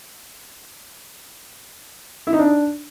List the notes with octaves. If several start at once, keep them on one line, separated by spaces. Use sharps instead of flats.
E4
D#4
D4